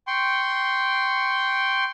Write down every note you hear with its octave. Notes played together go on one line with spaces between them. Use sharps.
G5 C6 C#6